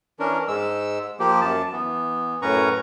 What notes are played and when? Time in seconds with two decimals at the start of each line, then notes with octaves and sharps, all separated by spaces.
0.20 E3 C#4 D4 A#4
0.48 G#2 G#3 E6
1.20 F3 A#3 G4
1.42 F#2 A5
1.73 E3 B3
2.42 F#2 A2 C#4 B4 A#5 C#6